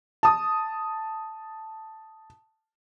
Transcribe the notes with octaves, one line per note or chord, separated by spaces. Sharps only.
A5 D#6